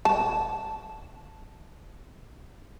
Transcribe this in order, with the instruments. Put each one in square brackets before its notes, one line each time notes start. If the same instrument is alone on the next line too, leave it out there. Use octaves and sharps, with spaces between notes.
[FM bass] D#1 [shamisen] A5